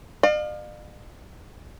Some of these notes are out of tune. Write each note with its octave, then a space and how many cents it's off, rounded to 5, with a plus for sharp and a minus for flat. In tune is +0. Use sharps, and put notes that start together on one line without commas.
D5 +45 F5 +20